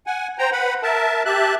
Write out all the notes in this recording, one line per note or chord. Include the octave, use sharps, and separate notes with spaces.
F#5 G#5
C5 G5 A#5
B4 F#5 B5
A#4 E5 A5
G4 E5 A5 F#6